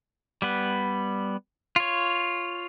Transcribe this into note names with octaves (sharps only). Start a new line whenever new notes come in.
G3 B3 B4
F4 C#5